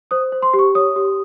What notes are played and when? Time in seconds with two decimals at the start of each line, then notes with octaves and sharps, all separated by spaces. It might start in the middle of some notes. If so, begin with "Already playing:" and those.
0.11 C5 D#6
0.32 C5
0.42 C6
0.54 G4
0.59 C#6
0.75 C#5 D#6
0.96 G4